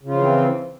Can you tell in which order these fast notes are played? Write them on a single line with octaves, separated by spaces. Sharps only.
C#3 F4 F3 E3 C4